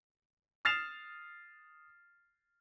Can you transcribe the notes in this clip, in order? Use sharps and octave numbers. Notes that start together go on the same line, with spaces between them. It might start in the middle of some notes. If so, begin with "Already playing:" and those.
D#6 F6 A6 C7 E7 F7